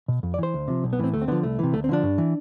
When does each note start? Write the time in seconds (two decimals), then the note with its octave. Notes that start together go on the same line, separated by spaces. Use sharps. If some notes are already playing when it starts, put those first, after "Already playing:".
0.08 B2
0.23 F2
0.34 D5
0.38 E3 C5
0.54 D2
0.68 C3 F3
0.84 B1
0.93 B3
0.99 A2 E3 C4
1.14 D2 A3
1.22 C4
1.28 D3 F3 B3
1.43 C2 A3
1.59 C3 E3
1.73 D2 A3
1.84 C4
1.89 D3 F3 D4
2.03 G2
2.18 E3